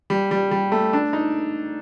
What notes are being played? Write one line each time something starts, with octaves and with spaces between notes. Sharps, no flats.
G3
G3
G3
A3
D4
D#4